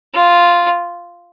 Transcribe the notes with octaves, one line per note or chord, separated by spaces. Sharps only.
F4